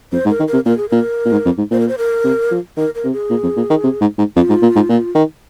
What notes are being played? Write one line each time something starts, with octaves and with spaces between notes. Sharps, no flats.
F2 C5
G#2
A#4
D#3
A#4
C3
A#2 A#4
G#4
A#2 A#4
A#2
G#2
F2
G#2
A#2 C5
A#4
C5
A#4
C3
F3
D#3 A#4
A#4
C3
G#4
A#2
F2
A#2
D#3
C3
G#2
G#2
F2 F4
G#2
A#2
G#2
A#2
D#3